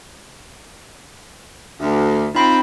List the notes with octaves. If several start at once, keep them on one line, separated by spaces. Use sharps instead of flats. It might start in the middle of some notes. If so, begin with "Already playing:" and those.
D2
F3 C4 D#4 B5